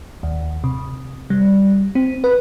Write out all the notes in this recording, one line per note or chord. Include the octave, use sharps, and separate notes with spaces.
D#2
C3
G3
C4
B4